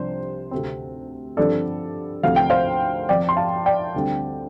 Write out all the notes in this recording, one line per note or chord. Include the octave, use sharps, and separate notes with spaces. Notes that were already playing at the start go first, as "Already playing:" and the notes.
Already playing: C2 C3 F3 D4 C5
D2 C3 A3 C4
G2 D3 F3 C4 A4 D5
D2 C3 F3 A3 C4 F5
G5
C5 F5
F2 F3 C4 D5 G5
C6
F5 A5
D5 G5
D2 D3 G3 C4